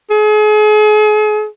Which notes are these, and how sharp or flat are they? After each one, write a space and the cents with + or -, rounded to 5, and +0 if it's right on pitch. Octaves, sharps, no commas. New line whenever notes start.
G#4 +40